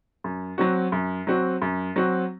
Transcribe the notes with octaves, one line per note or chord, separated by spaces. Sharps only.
F#2
F#3 C4 F#4
F#2
F#3 C4 F#4
F#2
F#3 C4 F#4